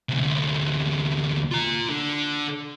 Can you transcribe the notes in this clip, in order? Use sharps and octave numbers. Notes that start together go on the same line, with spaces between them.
D2 C3
F4 A#5
D3